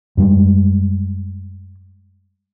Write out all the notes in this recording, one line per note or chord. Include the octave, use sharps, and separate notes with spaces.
F#2 G3 G#3